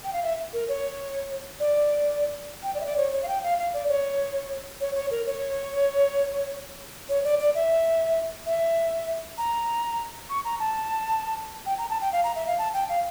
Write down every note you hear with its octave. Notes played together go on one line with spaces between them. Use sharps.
G5
F5
E5
A#4
C#5
D5
G5
D5
E5
D5
C#5
C#5
F5
G5
F5
F5
D5
C#5
C#5
C#5
A#4
C#5
C#5
D5
D5
E5
E5
A#5
C#6
A#5
A5
G5
A#5
A5
G5
F5
A#5
E5
F5
A5
G5
F5